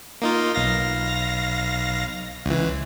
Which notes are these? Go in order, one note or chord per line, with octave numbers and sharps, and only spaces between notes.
A#3 D#4 F4
B1 F5 A#6
C#2 E3